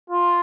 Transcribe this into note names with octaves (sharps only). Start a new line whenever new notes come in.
F4